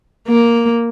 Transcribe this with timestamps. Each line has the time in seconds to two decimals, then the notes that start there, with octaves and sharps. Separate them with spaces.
0.28 A#3